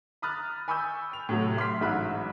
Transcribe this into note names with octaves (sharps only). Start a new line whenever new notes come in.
A#5 B5 D#6 F6 F#6 A6
G#5 B5 C#6 D#6 E6 G6
G5 F7
A2 C3 F#3 A3
E5 C6 F6 B6
A1 G#2 F#3 E5 B5 F#6